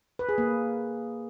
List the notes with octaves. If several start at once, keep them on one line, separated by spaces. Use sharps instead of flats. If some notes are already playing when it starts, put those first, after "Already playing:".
B4
G#4
A#3